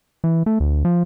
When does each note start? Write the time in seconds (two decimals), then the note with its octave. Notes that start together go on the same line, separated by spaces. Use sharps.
0.24 E3
0.46 A3
0.60 D2
0.85 F3